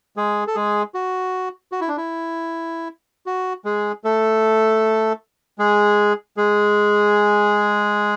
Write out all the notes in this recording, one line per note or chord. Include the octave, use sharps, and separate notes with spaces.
G#3 G#4
A4
G#3 G#4
F#4
F#4
E4
D4
E4
F#4
G#3 G#4
A3 A4
G#3 G#4
G#3 G#4